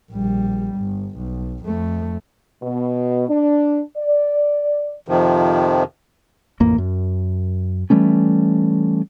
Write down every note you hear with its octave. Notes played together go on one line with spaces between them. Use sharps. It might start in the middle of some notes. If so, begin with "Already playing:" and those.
A#1 G3
G1
B1
F2 A3
B2
D4
D5
F2 C3 D#3 F3
A1 F2 A#3
F#2
E3 G3 A3 C#4